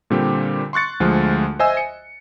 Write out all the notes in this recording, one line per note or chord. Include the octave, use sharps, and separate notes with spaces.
A#2 D3 G3 C4 G4
C6 C#6 F#6 A6 C#7
D2 F3 G#3 F4
C5 D#5 E5 G#5 E6
C#7